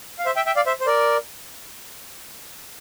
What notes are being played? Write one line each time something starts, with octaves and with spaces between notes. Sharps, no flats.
F5
C5 E5
E5 G5
E5 G5
D5 F5
C5 E5
C5
A#4 D5